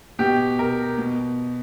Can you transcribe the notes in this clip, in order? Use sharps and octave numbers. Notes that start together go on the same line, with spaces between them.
B2 G4
A#4
B2